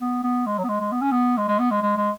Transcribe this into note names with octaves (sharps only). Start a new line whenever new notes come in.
B3
B3
G#3
F#3
B3
G#3
G#3
B3
C#4
B3
G#3
G#3
B3
G#3
G#3
G#3